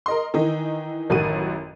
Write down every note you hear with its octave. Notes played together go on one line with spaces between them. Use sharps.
A#4 D#5 C6
D#3 E3 D#4
A1 F#2 D#3 F#4 D#7